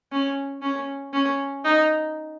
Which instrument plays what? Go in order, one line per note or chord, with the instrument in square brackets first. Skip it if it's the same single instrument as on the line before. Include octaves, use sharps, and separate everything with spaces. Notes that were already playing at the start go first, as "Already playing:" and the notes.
[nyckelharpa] C#4
C#4
C#4
D#4